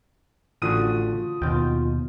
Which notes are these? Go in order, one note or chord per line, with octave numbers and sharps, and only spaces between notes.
A1 D3 F3 F#4 D#6 D#7
D#2 B2 F4 G5